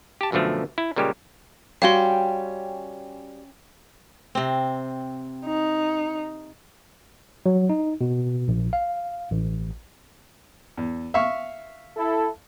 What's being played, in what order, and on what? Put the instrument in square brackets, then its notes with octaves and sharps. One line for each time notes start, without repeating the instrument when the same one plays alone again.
[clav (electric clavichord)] G4 A5
F#2 B2 D3 F3 A3
E4
A#2 C#3 G3 G#3 G4
[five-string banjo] G3 F#4 [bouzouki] C#4 G5 [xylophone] F5 C6
[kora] C3 C4
[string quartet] D#4
[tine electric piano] F#3
D#4
B2
A#1
F5
A1
[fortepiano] E2
E5 F5 C#6
[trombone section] E4 A4